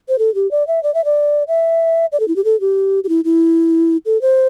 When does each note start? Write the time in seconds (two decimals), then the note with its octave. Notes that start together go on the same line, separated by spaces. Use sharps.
0.09 C5
0.19 A4
0.35 G4
0.51 D5
0.67 E5
0.83 D5
0.94 E5
1.05 D5
1.48 E5
2.12 D5
2.20 A4
2.28 E4
2.36 G4
2.45 A4
2.61 G4
3.04 G4
3.09 E4
3.25 E4
4.06 A4
4.22 C5